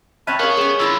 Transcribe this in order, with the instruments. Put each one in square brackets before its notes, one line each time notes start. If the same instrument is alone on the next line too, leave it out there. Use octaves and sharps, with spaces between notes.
[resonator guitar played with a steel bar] C4 C#5 E5 [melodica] A5 B5 [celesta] F6 F#6 D#7
[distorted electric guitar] B3 [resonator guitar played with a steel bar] G#4 F5 [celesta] A#4 [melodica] C#5
[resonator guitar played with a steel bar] G3 C#4 [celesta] G#4 E7 G7
[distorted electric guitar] G2 [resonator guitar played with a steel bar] D3 E4 F4 [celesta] E6